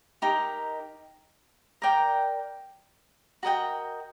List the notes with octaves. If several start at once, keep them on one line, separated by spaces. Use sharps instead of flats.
D#4 G4 A#4
A#4 D5 G5 A#5
F#4 A#4 D#5 G5